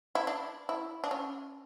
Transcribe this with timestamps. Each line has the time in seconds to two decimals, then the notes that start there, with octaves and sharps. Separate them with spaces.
0.15 E4
0.27 D4
0.69 E4
1.04 D4
1.11 C#4